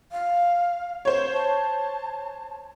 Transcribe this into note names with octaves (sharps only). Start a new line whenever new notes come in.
F5
C5 C#5
A5